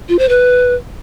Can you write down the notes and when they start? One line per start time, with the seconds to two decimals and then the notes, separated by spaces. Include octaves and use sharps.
0.09 F4
0.19 C5
0.29 B4